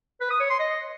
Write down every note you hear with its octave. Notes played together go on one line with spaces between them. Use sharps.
B4
D#6
C#5
C6
D#5